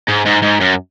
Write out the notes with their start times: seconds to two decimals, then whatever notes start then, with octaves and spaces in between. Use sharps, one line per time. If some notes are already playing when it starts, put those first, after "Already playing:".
0.08 G#2
0.26 G#2
0.42 G#2
0.60 F#2